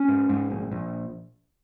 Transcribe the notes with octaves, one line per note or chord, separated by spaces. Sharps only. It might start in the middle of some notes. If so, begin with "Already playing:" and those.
Already playing: C#4
G#2
G#2
A#1
A#1